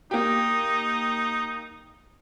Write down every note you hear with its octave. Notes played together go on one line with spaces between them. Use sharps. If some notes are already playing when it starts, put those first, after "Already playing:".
A#3 D#4 G4